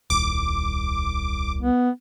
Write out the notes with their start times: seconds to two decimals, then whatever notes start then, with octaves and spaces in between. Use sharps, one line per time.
0.10 D#1 C2 D6
1.61 B3